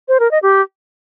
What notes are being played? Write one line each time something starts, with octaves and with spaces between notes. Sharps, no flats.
C5
A#4
D#5
G4